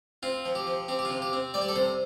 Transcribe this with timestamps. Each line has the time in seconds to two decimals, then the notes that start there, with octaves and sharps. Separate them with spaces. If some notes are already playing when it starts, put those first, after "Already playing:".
0.23 C4 F4
0.45 F3
0.55 G4
0.67 F3
0.88 C4 G4
0.99 G4
1.05 F4
1.10 C3
1.22 G4
1.33 C4
1.54 G3 D5
1.62 G4
1.69 A4
1.76 C3 C5